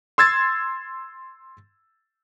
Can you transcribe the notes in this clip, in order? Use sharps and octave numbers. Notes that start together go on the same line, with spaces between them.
C6 E6 G#6 A6